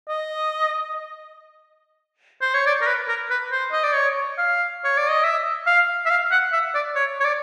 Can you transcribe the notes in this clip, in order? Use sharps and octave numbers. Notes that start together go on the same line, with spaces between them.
D#5
C5
C#5
D5
A#4
B4
A#4
B4
C5
D#5
D5
C#5
F5
C#5
D5
D#5
E5
F5
E5
F5
F#5
E5
D5
C#5
C#5
D5